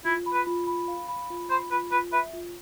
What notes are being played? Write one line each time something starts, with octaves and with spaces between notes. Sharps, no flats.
E4 F4
B5
B4
F4
B5
F5
B5
F4
C5 B5
F4 B4
F4 B4
B4 E5
F4